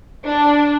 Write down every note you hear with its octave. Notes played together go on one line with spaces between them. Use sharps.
D4